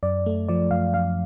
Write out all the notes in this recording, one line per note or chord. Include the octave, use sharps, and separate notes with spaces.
F#2 D5
A3
F3 D5
F#2 F5
F#2 F5